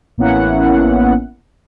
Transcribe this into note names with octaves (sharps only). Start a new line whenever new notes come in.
A1 A#3 B3 C#4 E4 F#5